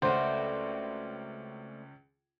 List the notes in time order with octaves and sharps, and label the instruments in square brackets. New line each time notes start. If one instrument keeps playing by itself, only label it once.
[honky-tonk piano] C#2 C#4 [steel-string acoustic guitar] A3 C4 [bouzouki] F#4 B4 [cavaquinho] C5 D5